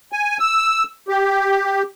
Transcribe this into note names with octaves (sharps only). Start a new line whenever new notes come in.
G#5
E6
G4